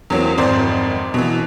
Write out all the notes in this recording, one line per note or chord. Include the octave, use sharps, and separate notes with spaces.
E2 F#3 A#3 C4
G#1 F2 C5 D5
B2 E3